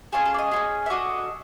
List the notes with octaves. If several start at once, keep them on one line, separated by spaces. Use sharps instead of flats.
C#4 F4 G#4 A4
A4
D5
D#5
C#4 F4 G#4
E5
D4 F#4 A4 D#5